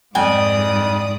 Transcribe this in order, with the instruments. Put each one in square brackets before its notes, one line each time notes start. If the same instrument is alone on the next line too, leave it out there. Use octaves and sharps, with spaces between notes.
[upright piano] F2 [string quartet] G#2 D5 D#6 [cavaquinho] G5 G#5